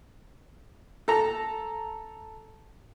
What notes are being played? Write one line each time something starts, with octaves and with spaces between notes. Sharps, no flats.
A4 A#5